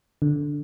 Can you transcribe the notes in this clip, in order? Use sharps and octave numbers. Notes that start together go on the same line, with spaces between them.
D3